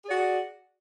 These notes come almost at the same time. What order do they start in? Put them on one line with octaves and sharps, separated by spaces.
G#4 D5 F#4